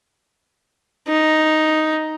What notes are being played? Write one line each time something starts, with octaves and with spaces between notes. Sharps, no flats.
D#4